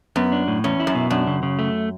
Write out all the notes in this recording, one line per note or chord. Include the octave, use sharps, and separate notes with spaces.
F#2 B3
D4
A2
E2 C#4
E4
F#2
B2
F#2 D4
C#3
C#3
A3